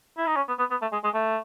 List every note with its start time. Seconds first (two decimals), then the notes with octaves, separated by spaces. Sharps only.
0.18 E4
0.27 D#4
0.36 C#4
0.48 B3
0.59 B3
0.71 B3
0.82 A3
0.93 G#3
1.04 G#3
1.14 A3